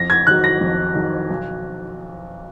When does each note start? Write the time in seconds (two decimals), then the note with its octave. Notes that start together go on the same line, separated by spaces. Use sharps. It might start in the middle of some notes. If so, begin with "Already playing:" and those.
Already playing: F2 A#6
0.10 G#6
0.27 D#3 F#3 F#6
0.44 A#6
0.61 F2
0.95 D#3 F#3
1.30 B1